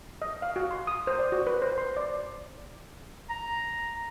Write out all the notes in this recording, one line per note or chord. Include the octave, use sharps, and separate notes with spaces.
D#5
F5
F#4
C6
D#6
C5
D5
F#4
B4
C5
C6
D5
A#5